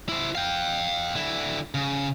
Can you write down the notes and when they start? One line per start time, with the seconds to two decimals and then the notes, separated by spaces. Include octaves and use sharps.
0.09 E4 C5
0.35 F5 G5
1.16 D3 E4
1.74 C#3